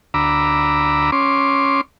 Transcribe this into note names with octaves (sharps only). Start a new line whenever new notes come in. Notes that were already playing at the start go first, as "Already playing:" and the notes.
D2 A#5 B5 D6 E6
C#4 C6 D6